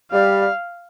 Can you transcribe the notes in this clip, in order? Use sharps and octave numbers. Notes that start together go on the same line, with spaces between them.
G3 F5